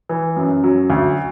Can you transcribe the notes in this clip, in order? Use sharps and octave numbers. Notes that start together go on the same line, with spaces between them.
E3
F#2
F#3
D2